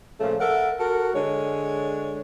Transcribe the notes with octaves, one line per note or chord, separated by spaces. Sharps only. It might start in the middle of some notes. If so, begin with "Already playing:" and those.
A#2 C#3 F3 A3
A4 A#4 E5 F#5
F#4 A4 A#4
D3 G#3 C#5